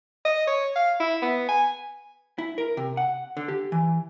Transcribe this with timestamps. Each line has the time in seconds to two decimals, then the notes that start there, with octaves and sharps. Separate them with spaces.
0.25 D#5
0.47 C#5
0.76 F5
1.00 E4
1.22 B3
1.49 G#5
2.38 E4
2.58 A#4
2.77 C3
2.97 F#5
3.37 D3
3.48 G4
3.72 E3